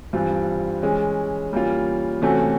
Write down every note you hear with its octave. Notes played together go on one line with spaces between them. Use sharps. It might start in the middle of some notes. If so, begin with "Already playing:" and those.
G2 E3 G3 C4 F4
E3 G#3 C#4
E3 G3 A#3 C#4 F4
C3 E3 A3 C#4 F#4